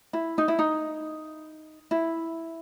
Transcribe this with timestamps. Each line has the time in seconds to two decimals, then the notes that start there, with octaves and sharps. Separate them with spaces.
0.13 E4
0.38 D#4
0.48 E4
0.59 D#4
1.91 E4